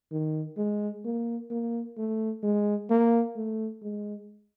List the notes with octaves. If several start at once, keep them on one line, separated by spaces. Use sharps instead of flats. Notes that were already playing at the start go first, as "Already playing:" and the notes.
D#3
G#3
A#3
A#3
A3
G#3
A#3
A3
G#3